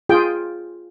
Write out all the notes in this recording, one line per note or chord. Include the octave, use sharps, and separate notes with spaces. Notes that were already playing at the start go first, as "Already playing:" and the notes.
F4 G#4 G5